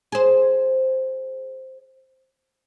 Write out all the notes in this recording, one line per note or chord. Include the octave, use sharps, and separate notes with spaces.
G#4 C5